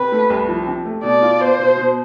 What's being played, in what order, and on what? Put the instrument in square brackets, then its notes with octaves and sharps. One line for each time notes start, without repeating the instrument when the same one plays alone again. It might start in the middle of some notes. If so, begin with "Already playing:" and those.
Already playing: [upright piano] C3 [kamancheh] B4
[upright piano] A3
C2
F3
C3
A3
[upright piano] B2 [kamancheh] D5
[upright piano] F4
[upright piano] B3 [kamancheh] C5
[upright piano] B2
B2